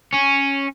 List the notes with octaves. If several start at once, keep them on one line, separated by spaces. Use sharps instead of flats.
C#4